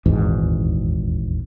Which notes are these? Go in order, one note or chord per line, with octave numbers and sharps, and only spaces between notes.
D#1 G#1 E2 G#2